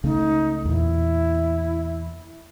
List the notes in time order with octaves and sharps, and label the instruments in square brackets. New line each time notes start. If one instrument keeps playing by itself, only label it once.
[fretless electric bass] C#2 C#3 A3 [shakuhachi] D#4
[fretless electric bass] E2 A#2 [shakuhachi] E4